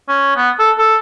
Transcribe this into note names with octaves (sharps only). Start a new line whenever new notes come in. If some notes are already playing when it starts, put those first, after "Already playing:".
C#4
B3
A4
A4